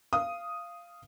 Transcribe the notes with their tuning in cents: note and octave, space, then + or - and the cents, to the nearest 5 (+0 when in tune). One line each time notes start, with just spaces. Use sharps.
F5 -15 D#6 +0